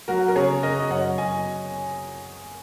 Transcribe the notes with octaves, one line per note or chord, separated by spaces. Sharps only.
F#3 F#4 A#4
A#4
C#3 G#4 C#5
C#3 A#4 D#5
D#5
F#2 C#5 F#5
F#2 D#5 G#5